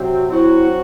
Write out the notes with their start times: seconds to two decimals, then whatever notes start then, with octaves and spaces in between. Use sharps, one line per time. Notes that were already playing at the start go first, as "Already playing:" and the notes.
Already playing: C3 F#3 C4 F#4
0.30 F#3 C4 E4 F#4